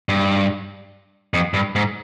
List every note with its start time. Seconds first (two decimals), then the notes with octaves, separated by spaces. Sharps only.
0.09 G2
1.34 F2
1.54 G2
1.75 G#2